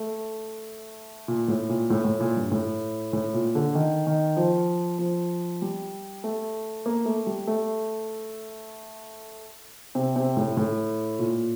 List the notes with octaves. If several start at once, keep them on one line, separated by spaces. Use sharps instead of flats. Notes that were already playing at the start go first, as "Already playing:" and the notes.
Already playing: A3
A#2
A2
A#2
A2
A2
A#2
G2
A2
A2
A#2
D3
D#3
D#3
F3
F3
G3
A3
A#3
A3
G3
A3
C3
C3
A2
A2
A#2